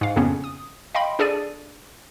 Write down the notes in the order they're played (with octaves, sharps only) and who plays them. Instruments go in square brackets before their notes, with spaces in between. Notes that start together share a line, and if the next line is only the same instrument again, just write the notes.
[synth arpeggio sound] G#2 F5
F2 C#3 A#3 B3 C#4
D#6
D#5 F5 G5 B5 C6
D4 G#4 A4 D5 D#7